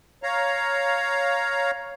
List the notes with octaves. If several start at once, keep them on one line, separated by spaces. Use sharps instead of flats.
C#5 F5 A#5